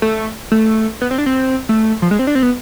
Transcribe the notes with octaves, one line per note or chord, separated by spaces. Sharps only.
A3
A3
B3
C4
D4
C4
A3
F3
G#3
C4
D4
C4
B3